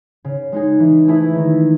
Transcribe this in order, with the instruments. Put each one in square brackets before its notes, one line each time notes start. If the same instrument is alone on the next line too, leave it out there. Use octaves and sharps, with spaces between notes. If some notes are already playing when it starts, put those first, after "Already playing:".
[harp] C#3
G#3 D#4 G#4
E3
A3 E4 G#4 B4
D#3